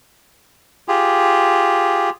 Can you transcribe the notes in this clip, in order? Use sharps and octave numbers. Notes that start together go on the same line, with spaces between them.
F4 G4 G#4